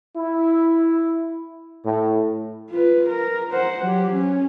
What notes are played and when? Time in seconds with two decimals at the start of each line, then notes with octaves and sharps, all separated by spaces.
0.16 E4
1.85 A2
2.71 F4 B4
3.08 A#4
3.52 C5 F#5
3.84 F#3 G4
4.14 C#4